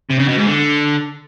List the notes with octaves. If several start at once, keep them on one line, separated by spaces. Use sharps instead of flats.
C3
C#3
B2
G#2
D3